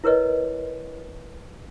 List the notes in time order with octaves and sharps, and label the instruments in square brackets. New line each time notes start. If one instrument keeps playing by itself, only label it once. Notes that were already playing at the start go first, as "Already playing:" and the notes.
[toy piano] E4 A#4 B4 C#5 D#5